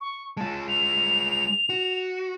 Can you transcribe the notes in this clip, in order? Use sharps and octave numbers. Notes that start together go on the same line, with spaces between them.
C#6
G#3 F4 A5
F7
F#4